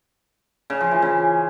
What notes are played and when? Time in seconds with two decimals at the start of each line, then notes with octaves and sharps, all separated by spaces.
0.70 C#3
0.81 F3
0.91 E3
1.02 C#3